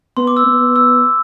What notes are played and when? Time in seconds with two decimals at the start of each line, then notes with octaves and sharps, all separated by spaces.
0.17 B3 C6
0.27 D6
0.37 E6
0.46 B3
0.76 E6